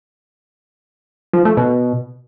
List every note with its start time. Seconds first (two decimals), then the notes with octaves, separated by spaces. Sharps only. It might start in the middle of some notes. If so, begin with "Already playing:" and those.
1.33 F3
1.45 A3
1.57 B2